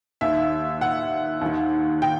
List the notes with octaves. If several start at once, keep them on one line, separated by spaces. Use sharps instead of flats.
D#2 D#3 E5
F#5
D#2 D#3
G5